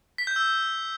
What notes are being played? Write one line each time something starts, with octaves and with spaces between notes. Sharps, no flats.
B6
G6
E6